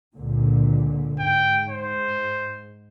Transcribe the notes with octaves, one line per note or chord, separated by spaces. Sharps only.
C#2 A#2 D3
G#2 G5
C5